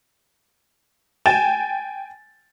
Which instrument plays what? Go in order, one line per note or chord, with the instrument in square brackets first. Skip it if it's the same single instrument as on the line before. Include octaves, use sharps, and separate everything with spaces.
[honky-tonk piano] G5 G#5 A6 E7